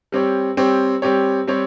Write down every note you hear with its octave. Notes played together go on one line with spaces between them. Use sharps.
G3 C4 G4 C#5
G3 C4 G4 C#5
G3 C4 G4 C#5
G3 C4 G4 C#5